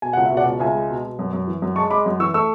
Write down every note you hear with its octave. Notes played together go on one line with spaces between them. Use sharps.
B2 G#5
C#2 F#5
E5
B2
D5 F#5
C#2
C#2 E5 G#5
G#3
B2
B2
F#2
F#2
E3
F#2
G#3 A5 C#6
G#3 B5 D6
F#2
E3 C#6 E6
A3 C#6 E6